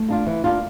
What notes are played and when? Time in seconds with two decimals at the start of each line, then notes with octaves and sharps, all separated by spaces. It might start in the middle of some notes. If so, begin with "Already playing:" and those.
Already playing: A3
0.08 A#3 D4 F4
0.26 E3
0.44 A#3 D4 F4